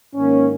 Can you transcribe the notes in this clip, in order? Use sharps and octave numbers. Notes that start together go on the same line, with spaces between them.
G#2 D#3 A#3 C#4